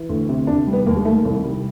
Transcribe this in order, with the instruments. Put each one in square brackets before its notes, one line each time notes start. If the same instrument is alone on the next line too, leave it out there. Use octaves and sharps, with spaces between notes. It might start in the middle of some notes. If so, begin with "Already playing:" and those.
Already playing: [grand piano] E3
D2
C3
D#2 D4
G3
B3
D#2 A#3
G#3
D#3 A3
C2
G3